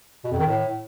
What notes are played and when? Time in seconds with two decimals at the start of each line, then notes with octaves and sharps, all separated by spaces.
0.24 B2
0.32 F2
0.39 D#3
0.46 A2